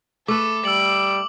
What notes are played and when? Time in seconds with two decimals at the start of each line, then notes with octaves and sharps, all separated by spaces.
0.28 A3 A4 B4 D6
0.65 G3 E6 D7 F#7